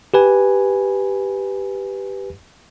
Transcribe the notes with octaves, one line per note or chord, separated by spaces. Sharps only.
G4 B4 G#5